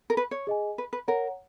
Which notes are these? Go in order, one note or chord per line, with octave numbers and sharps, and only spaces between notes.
A#4
B4
C#5
G#4 D#5 G#5
B4
B4
A#4 C#5 F#5 A#5